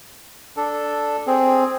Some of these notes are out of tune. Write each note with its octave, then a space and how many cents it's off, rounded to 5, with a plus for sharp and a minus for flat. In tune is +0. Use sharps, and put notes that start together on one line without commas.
D4 +0 A4 +0
C4 +0 G#4 +0